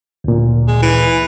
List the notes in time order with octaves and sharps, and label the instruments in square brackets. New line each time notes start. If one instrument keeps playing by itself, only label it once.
[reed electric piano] D2 A#2
[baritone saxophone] G#3
E3